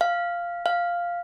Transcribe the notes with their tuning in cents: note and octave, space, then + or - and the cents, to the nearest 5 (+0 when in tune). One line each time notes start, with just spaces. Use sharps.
F5 -5
F5 +0